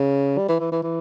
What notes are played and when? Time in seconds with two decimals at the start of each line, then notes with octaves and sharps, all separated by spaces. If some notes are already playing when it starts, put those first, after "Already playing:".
Already playing: C#3
0.38 G3
0.49 E3
0.60 E3
0.72 E3
0.83 E3